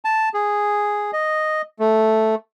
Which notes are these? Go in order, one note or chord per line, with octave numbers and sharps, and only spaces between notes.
A5
G#4
D#5
A3